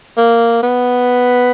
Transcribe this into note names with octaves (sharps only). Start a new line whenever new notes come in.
A#3
B3